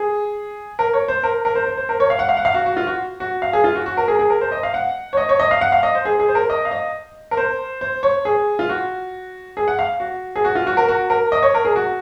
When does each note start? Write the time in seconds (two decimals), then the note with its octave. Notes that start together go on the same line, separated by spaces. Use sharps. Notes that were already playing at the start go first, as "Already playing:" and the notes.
Already playing: G#4
0.79 A#4
0.93 C#5
1.08 C5
1.24 A#4
1.45 A#4
1.55 C5
1.66 C5
1.78 C5
1.89 A#4
2.00 C#5
2.10 F5
2.19 F#5
2.29 F5
2.37 F#5
2.45 F5
2.54 F#4
2.66 F#4
2.77 F4
2.87 F#4
3.20 F#4
3.42 F5
3.53 G#4
3.64 F4
3.75 F#4
3.86 F#4
3.97 A#4
4.08 G#4
4.19 G#4
4.30 A#4
4.41 C5
4.52 D#5
4.63 F5
4.74 F#5
5.13 C#5
5.17 D#5
5.29 C#5
5.39 D#5
5.51 F5
5.61 F#5
5.72 F5
5.83 D#5
5.95 C5
6.05 G#4
6.20 G#4
6.28 C5
6.35 A#4
6.50 D#5
6.65 F5
6.71 D#5
7.31 A#4
7.37 C5
7.81 C5
8.03 C#5
8.25 G#4
8.59 F4
8.69 F#4
9.57 G#4
9.68 F#5
9.79 F5
10.00 F#4
10.36 G#4
10.44 F#4
10.55 F4
10.67 F#4
10.77 A#4
10.88 F#4
11.10 A#4
11.32 D#5
11.43 C#5
11.55 A#4
11.65 G#4
11.76 F#4